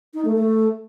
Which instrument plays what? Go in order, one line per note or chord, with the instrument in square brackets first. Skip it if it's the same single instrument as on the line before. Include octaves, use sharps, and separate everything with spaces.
[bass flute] D#4
A3
A3